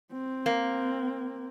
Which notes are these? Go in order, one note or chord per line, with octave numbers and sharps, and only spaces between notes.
C4
A#3